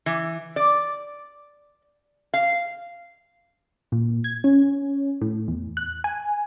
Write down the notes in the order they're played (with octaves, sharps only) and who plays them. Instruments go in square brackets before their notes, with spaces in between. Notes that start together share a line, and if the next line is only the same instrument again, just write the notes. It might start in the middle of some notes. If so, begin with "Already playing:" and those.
[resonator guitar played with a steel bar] E3
D5
F5
[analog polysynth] A#2
G#6
C#4
A2
E2
F#6
G#5